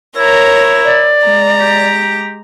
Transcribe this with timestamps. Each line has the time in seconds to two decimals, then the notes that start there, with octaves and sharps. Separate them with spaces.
0.17 E4 A#4 C#5 A#5
0.84 D5
1.24 G#3 A#5
1.60 G4